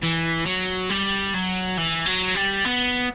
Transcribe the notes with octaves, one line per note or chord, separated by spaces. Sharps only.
E3
F#3
G3
F#3
E3
F#3
G3
B3